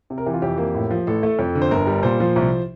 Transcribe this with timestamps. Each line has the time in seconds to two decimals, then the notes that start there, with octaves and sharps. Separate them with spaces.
0.10 C3
0.18 A#4
0.26 E3 G4
0.34 F4
0.42 F2 G4
0.58 A#3
0.75 A2
0.90 F3
1.07 A1 A4
1.23 A3
1.39 F2
1.55 D3
1.62 C5
1.71 G1 A#4
1.87 G3
2.03 A#2 C5
2.20 F3
2.36 C2